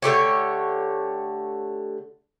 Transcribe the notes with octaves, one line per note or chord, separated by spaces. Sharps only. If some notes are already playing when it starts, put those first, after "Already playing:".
D3 A3 G4 C#5